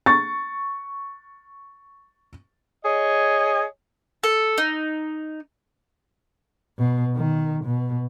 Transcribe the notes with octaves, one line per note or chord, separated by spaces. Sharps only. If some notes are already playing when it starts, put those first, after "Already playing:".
C#6 A6
G#4 C#5 D#5
A4
D#4
B2
D#3
B2